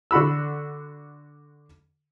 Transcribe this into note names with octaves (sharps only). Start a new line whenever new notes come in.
D3 F#4 B5 E6